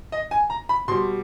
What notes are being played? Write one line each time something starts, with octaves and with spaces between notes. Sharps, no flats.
D#5
G#5
A#5
B5
B2 G3 C6